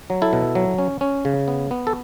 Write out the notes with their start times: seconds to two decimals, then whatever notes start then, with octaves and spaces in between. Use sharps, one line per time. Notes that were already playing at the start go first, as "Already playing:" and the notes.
0.10 F#3
0.22 E4 A4
0.33 B2
0.55 F#3
0.78 C#4
1.01 C#4
1.25 C#3
1.48 B3
1.71 B3
1.87 A4